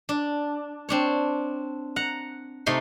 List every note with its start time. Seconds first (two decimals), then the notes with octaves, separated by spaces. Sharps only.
0.09 D4
0.89 C4 D4 C#5
1.96 F#5 A#5
2.66 C3 A3 D#4 C6